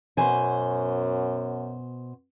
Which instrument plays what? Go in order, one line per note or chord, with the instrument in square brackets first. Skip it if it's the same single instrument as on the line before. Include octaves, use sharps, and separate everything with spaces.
[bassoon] F#2 [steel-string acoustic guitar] B2 C5 G#5